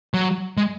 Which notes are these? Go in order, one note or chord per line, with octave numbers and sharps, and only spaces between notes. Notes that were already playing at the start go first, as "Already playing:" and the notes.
F#3
G#3